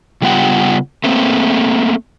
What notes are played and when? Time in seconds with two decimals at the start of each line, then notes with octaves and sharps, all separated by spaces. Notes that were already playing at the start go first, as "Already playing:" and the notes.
0.22 C#3 G3 B3 F4 F#5 G5
1.04 A3 A#3 C4